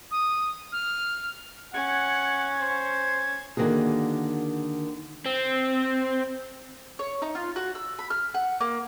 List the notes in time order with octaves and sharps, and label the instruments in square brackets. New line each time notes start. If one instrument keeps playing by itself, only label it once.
[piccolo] D#6
F6
[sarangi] C#4 [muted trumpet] F#5 [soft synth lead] G#6
[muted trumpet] C5
[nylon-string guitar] D3 D#3 A#3 F#4 G#4
[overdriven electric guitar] C4
[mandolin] C#5
D#4
F4
F#4
E6
B5
F6
F#5
A#3